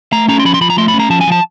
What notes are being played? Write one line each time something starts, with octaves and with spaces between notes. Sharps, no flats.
A3 A#5
C#4 A#5
C6
F3 B5
C6
F3 B5
A#5
A3 C6
B5
C#4
A#5
F3 A5
G#5
F3 A5